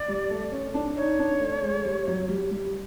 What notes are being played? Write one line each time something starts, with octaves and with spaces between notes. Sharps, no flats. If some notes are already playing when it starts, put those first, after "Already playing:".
Already playing: D5
G3
A3
C#4
D4
D#4 C#5
D4
A3
G#3
G3
F#3
G3
G3